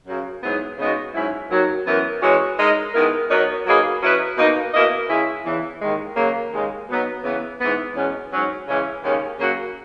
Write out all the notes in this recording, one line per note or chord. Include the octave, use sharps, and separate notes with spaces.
F#2 C#3 F#3
G#2 F#3 B3 E4 G#4
C#3 G#3 B3 D#4 F#4
G#2 F#3 C#4 E4
D#2 D#3 F#3
F#2 E3 B3 E4 A#4
E3 G#3 C#4 F#4 C#5
G#3 D#4 A#4 D#5
D#3 G#3 B3 E4 A#4
F#3 B3 D#4 A#4 C#5
F#3 A#3 D#4 G#4 B4
F#3 C#4 E4 B4 D#5
B2 A#3 D#4
B2 A#3 E4 A#4 D#5
C#3 G#3 C#4 E4
E2 C#3 E3
D#2 D#3 G#3
C#3 F#3 A#3
D#2 C#3 G#3
B2 F#3 B3 D#4
C#3 E3 B3
G#2 E3 B3
E2 B2 G#3 C#4
G#2 F#3 C#4
C#3 E3 G#3 C#4
D#2 C#3 G#3 C#4
C#3 F#3 A#3 C#4 F#4